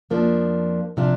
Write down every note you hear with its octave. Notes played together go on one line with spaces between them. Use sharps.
F2 F3 A#3 D4
C3 F3 D4 F4